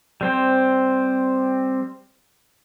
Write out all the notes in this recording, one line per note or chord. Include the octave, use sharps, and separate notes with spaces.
G3 C4 C5